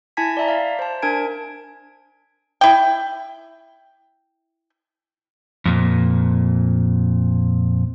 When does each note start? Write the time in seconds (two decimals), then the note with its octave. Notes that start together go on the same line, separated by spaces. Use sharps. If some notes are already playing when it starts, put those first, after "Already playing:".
0.17 E4 G#5 A5 G#6 B6
0.37 D5 E5 A#5
0.48 F5
0.79 C5 A5
1.02 D4 A#4 G#5 G#6 D7
2.61 E4 G5
5.66 F2 A#2